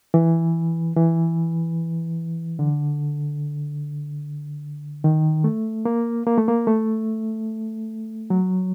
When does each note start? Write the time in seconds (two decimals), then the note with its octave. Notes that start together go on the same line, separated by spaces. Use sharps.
0.14 E3
0.96 E3
2.59 D3
5.04 D#3
5.44 A3
5.85 A#3
6.26 A#3
6.38 A3
6.48 A#3
6.67 A3
8.30 F#3